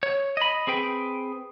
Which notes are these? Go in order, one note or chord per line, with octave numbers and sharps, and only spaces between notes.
C#5
D#5 B5
C4 G#4 B4 G5